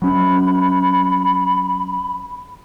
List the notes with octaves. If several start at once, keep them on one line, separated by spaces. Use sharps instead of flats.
F#3 C#4 B5